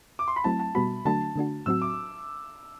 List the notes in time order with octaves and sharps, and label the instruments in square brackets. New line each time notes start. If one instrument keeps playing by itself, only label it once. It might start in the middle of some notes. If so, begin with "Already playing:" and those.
[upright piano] D6
C6
B5
[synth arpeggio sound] F#3 A3 C4 E4 [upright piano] A5
[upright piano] A5
[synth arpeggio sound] B2 G3 B3 F#4 [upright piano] B5
[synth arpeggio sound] D3 F#3 A3 D4 F#4 [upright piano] A5
[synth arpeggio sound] D3 A3 D4 F#4
[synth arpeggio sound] A2 F#3 C4 F#4 [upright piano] E6
[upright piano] D6